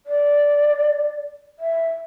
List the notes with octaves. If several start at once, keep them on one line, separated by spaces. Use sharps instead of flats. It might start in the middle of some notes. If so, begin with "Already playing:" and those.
D5
E5